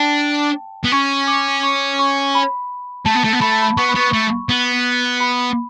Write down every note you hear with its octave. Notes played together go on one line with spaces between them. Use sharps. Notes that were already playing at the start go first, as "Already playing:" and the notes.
Already playing: D4 G5 A5
B3
C#4 C#6
D6
C#6
C#6
B5
A3 A5
B3
A3
B3
A3 B5
A5
B5
B3 C#6
B5
B3 C#6
A3
B3
B5